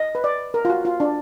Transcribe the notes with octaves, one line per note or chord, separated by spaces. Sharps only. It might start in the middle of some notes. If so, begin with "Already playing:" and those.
Already playing: D#5
B4
D5
A#4
F4
F#4
F4
D4